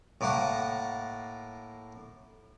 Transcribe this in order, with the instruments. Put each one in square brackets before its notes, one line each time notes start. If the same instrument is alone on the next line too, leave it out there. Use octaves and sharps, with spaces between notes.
[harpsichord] A2 A#3 F#5